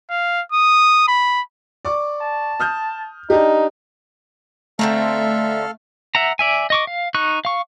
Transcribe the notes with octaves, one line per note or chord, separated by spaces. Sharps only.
F5
D#6
B5
D5 C#6 D6
A5
D#6 F6 G6
D4 D#4 G4
D3 A3 C4 A4 E5 F5 A#5
E5 F#5 A#5
D5 E5 G#5
D#5 C#6 D6
F5
D#4 C#6 F#6
F5 C#6